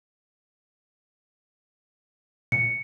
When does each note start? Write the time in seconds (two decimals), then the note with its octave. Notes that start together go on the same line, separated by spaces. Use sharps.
2.52 A#2 C#7